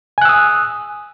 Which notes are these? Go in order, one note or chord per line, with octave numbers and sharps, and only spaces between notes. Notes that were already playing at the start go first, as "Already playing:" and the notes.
G#5 D#6 E6 F#6